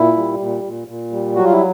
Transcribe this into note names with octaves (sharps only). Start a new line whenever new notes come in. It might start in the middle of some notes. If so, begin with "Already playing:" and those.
Already playing: A#2 E4
G3
A#2
A#2
A#2
G3
F#3 F#4
F4
E4